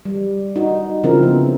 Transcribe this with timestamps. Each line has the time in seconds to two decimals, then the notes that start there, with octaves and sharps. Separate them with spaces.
0.05 G3
0.56 D#4 F#4
1.03 C#3 F3 C4 E4 A#4
1.23 C#3 B3